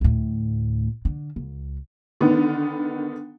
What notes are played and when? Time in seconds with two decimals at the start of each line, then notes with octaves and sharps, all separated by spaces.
0.01 D2 A2
1.05 D3
1.36 C#2
2.21 D3 D#3 B3